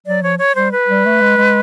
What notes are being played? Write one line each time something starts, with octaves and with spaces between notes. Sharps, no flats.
F#3 D5
F3 C#5
C#5
G3 C5
B4
G3
A3
G#3
G#3